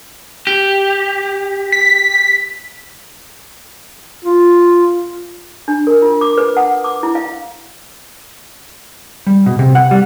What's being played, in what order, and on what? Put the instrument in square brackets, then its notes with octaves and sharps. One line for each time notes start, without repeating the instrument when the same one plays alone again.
[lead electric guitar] G4
[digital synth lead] B6
[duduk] F4
[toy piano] D4
A#4
F4
D6
B4
F#5
D6
E4
F5
[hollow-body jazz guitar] G3
B2
C3
F#5
G3